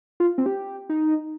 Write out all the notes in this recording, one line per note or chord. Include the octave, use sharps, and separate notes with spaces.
F4
C4
G4
D#4